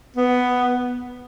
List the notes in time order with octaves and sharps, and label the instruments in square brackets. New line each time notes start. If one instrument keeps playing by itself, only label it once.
[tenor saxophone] B3